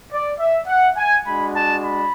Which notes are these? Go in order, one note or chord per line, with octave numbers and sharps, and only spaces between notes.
D5
E5
F#5
G#5
G#3 D4 F#4 B5
A5
B5